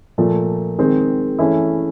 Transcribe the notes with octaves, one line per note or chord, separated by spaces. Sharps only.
A#2 F3 A3
D#3 G#3 C4
E3 A3 C#4 E4